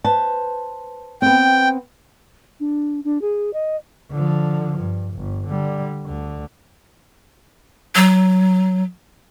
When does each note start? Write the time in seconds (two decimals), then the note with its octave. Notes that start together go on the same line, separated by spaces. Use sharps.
0.04 B4 C5 A5
1.22 B3 C4 G5
2.60 D4
3.04 D4
3.21 G#4
3.53 D#5
4.12 D3 F3
4.80 G2
5.15 G1
5.47 D3 G3
6.06 D2 D3
7.96 F#3